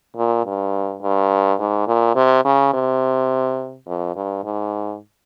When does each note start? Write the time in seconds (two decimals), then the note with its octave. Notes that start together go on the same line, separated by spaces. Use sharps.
0.16 A#2
0.45 G2
1.02 G2
1.59 G#2
1.87 A#2
2.15 C3
2.45 C#3
2.73 C3
3.87 F2
4.16 G2
4.44 G#2